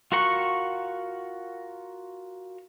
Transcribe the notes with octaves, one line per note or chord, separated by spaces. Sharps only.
F4 F#4 A#4 F#5 C#6